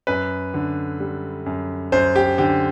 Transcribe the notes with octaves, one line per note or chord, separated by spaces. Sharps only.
F#2 B4
D3
G3
F#2
F#2 C5
G4
D3 G4